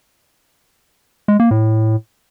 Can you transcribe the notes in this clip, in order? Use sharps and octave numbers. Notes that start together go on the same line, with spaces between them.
G#3
A#3
A2